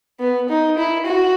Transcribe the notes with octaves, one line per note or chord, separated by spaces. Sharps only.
B3
D#4
E4
F#4